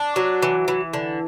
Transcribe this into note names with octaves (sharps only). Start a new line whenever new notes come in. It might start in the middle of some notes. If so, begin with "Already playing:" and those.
Already playing: D4
F#3
E3
E3
D3